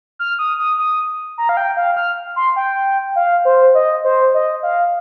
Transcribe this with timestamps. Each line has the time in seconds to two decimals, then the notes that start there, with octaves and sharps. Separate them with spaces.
0.19 F6
0.39 D#6
0.59 D#6
0.78 D#6
1.38 A#5
1.49 F5
1.57 G5
1.77 F5
1.97 F6
2.36 C6
2.56 G5
3.16 F5
3.45 C5
3.75 D#5
4.04 C5
4.34 D#5
4.63 F5